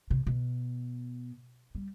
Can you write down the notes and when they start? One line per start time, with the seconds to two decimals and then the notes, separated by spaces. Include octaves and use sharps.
0.10 C3
0.27 B2
1.75 G3